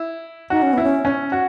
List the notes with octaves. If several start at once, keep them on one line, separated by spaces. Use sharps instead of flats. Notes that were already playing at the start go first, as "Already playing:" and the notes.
Already playing: E4
D#4 F#4
C#4
B3 E4
C#4
C#4
F#4